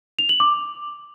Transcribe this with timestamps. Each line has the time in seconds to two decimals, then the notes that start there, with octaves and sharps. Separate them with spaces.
0.19 F7
0.29 F#7
0.40 D6